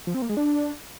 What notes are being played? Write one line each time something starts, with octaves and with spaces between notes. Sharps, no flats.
F3
C4
A#3
G#3
D4